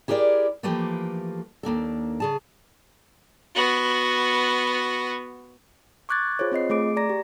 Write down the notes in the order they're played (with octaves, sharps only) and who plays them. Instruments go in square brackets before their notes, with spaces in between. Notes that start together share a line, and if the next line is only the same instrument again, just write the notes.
[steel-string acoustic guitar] E4 G4 G#4 A#4 C#5 D5
E3 F3 A3 A#3 G4 B4
D#2 A#3 D4 A4
C#3 G#4 A5
[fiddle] B3 F#4
[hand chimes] C#6 D6 F#6 G#6 A6
F4 G#4 C5 C#5
C4 F4 D#5 C7
A3 G#4 D6 D7
D5 A#5 A#6
G4